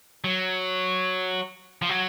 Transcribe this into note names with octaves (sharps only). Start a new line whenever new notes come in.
F#3
F3
F#3